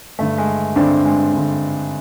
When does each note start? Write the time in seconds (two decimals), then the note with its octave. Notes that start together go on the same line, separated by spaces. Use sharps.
0.19 G2 D3 A3
0.38 G#3
0.76 G2 D3 C4 D4
1.05 G#3
1.33 G2 D3